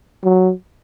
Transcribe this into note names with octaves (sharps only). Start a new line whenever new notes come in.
F#3